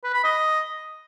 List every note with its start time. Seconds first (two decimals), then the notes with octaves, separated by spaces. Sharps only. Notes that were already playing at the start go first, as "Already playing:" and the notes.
0.04 B4
0.14 B5
0.24 D#5